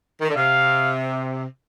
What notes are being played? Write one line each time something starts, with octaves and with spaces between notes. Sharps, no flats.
D#3
D3
C3 F5